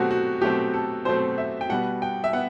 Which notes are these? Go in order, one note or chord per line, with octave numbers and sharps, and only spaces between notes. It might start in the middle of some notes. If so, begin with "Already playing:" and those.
Already playing: B2 F#3 A3 C4 F#4 G4
F#4
B2 F#3 A3 C4 G4
A4
B2 F#3 A3 C4 C5
E5
G5
B2 G3 B3 F#5
G5
E5
B3 F#5